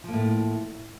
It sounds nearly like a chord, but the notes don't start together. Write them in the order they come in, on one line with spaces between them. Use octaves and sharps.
F3 A#3 A2